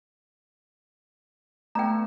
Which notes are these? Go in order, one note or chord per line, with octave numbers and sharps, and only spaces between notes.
A3 B3 G5 A#5